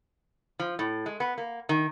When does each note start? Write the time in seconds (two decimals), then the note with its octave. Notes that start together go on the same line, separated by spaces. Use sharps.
0.59 F3
0.79 A2
1.06 G#3
1.20 B3
1.38 A#3
1.69 D#3